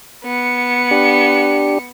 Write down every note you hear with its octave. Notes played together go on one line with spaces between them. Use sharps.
B3 C#7
D4 G4